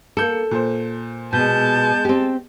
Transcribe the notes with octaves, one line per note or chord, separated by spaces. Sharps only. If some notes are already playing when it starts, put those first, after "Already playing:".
A#3 A4 G6 C#7
A#2 C5
B2 G#3 A5 G6
C4 G4